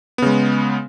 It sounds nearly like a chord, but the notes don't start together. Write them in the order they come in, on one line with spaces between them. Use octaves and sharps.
B3 C#3 G#3